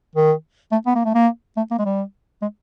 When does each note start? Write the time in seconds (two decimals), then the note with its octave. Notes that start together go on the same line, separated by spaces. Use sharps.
0.15 D#3
0.72 A3
0.86 B3
0.95 A#3
1.05 A3
1.15 A#3
1.57 A3
1.71 A#3
1.79 G#3
1.85 G3
2.42 G#3